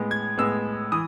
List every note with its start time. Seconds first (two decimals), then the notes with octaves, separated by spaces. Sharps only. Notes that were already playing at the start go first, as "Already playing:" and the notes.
Already playing: A2 G#3 B3
0.11 G#6
0.38 A2 G#3 B3 E6
0.92 E3 D#6